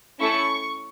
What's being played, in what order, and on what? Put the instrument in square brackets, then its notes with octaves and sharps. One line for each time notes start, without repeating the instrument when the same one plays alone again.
[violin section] A3 C#4 E4 A4 C#6